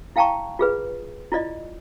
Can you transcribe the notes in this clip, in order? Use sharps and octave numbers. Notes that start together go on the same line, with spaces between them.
E4 F5 G5 A5 A#5 C#6
F4 G#4 B4
E4 F4 D5 D#5